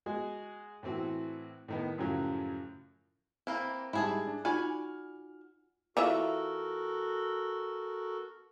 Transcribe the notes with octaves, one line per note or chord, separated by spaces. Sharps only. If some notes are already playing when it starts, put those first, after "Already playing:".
G#3 F#4 G#4
A2 E3 C4 F#4
A2 D#3 B3
F#2 A2 C#3 F3 F#3
E3 A#3 C4 E4
G#2 G3 E4 G#4 A5
D4
D#4 F4 F#4 D5 G#5 F6
E3 F4 F#4 A4 A#4 E5